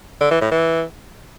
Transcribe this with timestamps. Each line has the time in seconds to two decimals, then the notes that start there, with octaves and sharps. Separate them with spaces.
0.21 D3
0.31 E3
0.41 A2
0.52 E3